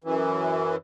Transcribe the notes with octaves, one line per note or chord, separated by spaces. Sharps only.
F#2 E3